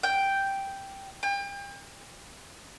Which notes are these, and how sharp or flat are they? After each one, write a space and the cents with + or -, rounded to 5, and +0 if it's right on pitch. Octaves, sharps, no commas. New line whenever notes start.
G5 +0
G5 +35